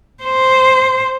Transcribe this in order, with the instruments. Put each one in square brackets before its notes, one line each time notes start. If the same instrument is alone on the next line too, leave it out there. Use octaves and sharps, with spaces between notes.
[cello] C5